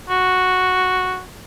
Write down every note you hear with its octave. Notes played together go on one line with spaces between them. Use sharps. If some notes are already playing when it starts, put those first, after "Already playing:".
F#4